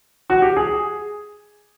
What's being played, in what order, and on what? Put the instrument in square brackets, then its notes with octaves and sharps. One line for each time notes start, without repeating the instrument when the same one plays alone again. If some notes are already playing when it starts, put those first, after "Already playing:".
[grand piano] F#4
G4
G#4